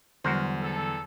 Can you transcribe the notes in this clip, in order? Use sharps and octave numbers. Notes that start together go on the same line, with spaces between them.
E2 D3 F#3 G3 F#4 A#4 C5
A4